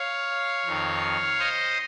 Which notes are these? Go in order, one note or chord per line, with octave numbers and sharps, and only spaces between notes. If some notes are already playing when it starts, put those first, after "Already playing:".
Already playing: C#5 F5
F2 D#3
C5 D#5